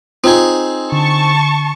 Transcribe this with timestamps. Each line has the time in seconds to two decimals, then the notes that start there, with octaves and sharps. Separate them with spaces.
0.24 C4 D#4 F4 G#4
0.92 D3 A5 C#6